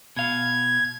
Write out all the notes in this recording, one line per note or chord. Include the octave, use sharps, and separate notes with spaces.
B2 F5 G#6